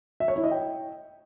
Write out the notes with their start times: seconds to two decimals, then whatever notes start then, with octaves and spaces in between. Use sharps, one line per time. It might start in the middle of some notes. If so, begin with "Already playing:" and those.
0.20 E5
0.28 C#5
0.36 E4
0.44 D#5
0.51 G5